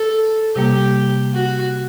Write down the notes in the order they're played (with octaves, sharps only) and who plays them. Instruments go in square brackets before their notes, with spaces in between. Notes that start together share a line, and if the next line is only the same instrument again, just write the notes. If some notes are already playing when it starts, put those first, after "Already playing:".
Already playing: [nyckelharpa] A4
[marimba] C3 G3 A#3 [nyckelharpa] G4
[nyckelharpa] F#4